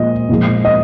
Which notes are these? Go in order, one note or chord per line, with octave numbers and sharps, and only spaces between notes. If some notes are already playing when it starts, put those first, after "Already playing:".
Already playing: A#2 F3 G#3 D#5
A#2 F3 G#3
D#5